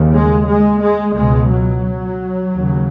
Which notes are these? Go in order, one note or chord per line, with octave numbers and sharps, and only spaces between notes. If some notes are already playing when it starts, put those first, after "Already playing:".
Already playing: D#2 C#3
G#3
G#3
G#3
C#2 B2 G#3
F#3
D#2 C#3